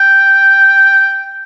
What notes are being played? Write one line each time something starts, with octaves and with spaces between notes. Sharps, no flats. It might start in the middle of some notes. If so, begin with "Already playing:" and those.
Already playing: G5